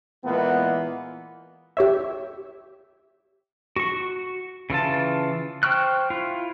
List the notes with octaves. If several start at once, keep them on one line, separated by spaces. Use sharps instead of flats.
A#2 E3 G#3 A#3 B3
G4 C#5 E5
F#4 C#6
C#3 E3 F4 A5
C5 G5 C#6 F6 F#6
E4 F4